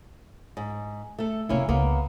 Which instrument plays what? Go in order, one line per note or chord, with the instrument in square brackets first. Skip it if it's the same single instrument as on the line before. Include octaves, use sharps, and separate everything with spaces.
[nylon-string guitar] G#2
A3 A4
[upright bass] F1 C2 [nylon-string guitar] A#3 C#4 E4
[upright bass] C#2 [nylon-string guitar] A#3 B3